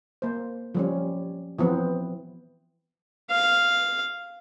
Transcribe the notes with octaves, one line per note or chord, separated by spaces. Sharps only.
A#3 C5
F3 G3 C#4
E3 F3 B3 C4
F5